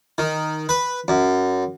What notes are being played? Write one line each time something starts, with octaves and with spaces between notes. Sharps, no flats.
D#3
B4
F#2